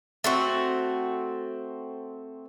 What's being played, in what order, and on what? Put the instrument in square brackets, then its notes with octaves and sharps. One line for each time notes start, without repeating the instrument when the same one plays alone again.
[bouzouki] A3 C4 F#4